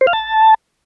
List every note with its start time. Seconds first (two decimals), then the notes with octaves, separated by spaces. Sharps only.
0.01 C5
0.07 F5
0.13 A5